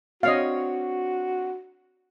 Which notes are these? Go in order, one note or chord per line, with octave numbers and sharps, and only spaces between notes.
C4 D4 F#4 C#5 D#5 F5